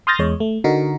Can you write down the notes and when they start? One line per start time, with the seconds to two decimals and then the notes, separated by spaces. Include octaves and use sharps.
0.07 C6 D#6 F6 G6 A6 A#6
0.19 E2 G#3 C#5
0.40 A3
0.64 D3 D#4 F#4 A#4